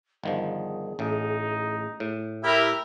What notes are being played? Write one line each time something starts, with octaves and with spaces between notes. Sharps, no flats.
G1 D#3 F3 G#4
A1 A2 D#4
A2
E4 G4 A#4 E5